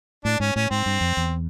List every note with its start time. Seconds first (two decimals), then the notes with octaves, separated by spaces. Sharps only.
0.25 A2 D4
0.40 G#2 C#4
0.55 A2 C#4
0.71 G#2 C4
0.86 G2
1.01 F2
1.17 E2